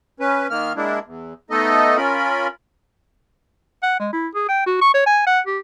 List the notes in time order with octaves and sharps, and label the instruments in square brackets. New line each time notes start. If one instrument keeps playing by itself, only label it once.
[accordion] C#4 B4
D#3 A#3 F6
G#3 A#3 D4 E4
E2
A3 B3 D#4 A4 D#5
C#4 F4 A#4 B5
[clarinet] F#5
G#3
E4
G#4
G5
F#4
C#6
C#5
G#5
F#5
G4